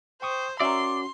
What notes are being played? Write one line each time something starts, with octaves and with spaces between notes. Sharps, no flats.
C5 G5 C#6 D#6
C#4 F#4 A#4 D5 E5 C6